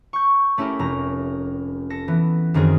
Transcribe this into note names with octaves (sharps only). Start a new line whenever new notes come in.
C#6 G6
A3 C#4 E4 G4 A#4
F1 A#5
A4 A#6 C#7
E3 B3
F#2 D#3 C4 G#4